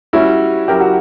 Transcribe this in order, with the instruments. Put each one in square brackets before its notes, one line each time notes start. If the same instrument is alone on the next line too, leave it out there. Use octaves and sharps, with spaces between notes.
[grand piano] G3 C#4 F#4 [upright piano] E4
[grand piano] F#3 C#4 E4 A#4 [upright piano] G4
[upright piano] F#4